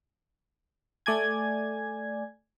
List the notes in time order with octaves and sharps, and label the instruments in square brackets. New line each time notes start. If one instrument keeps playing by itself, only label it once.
[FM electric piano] A3 D5 G#5 G#6